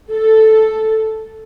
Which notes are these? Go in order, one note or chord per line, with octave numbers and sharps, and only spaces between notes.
A4